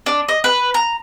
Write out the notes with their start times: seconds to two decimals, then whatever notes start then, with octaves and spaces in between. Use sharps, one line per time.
0.06 D4
0.28 D#5
0.44 B4
0.74 A#5